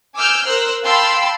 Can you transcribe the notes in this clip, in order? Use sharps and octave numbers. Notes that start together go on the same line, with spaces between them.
G#5 D6 E6 F6 G6
A#4 C5 E6 F#6
F5 G5 A5 B5 C6 E6